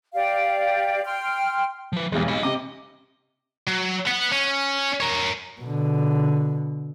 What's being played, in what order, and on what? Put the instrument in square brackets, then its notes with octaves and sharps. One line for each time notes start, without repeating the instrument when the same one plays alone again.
[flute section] G4 D5 F5
G5 C6 F6
[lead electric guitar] F3 B4
[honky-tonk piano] B1 G3 G#3 [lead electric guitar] E2
[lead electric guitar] D#5 B5
[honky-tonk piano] C3 D6 [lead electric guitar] D#5
[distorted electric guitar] F#3
B3 F#5
C#4
A#4 C#5
[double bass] B2 D3